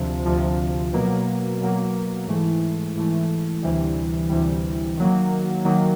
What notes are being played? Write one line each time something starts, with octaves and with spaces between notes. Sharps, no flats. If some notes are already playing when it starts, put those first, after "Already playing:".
Already playing: D2 C3 F3
D2 C3 F3
B2 F#3 A#3
B2 F#3 A#3
G#2 E3 A3
G#2 E3 A3
D2 C3 E3 G3
D2 C3 E3 G3
D#3 F#3 A#3
D#3 F#3 A#3